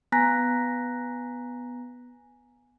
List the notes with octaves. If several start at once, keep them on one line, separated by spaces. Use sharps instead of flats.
B3 G#5 A#5 F#6 A#6 B6